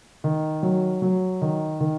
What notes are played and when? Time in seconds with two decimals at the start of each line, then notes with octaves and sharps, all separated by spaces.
0.24 D#3
0.63 F#3
1.02 F#3
1.42 D#3
1.80 D#3